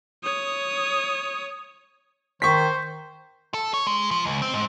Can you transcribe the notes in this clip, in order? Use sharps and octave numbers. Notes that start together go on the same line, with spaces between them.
C#5 D#6
D#3 C5 C#6 B6
A4
C#5
G#3
F3
C#2
C4
G#2